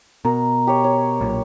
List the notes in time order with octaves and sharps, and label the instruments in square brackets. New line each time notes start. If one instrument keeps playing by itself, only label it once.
[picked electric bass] B2 [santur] A#4
[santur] G4 C#5
C#5
[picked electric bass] B1 A#2